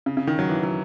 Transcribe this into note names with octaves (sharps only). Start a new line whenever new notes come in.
C#3
C#3
D#3
F#3
E3
F#3